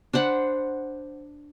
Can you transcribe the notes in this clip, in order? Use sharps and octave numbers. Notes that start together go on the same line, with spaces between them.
D4 C5 F#5 B5